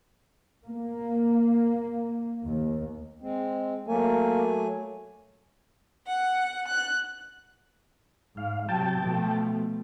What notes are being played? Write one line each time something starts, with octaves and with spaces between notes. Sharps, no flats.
A#3
D#2
G#3 C4
F#3 A3 A#3 G#5
F#5
F#6
G#2 F5
C3 F#3 G5 A5
B2 F3 A3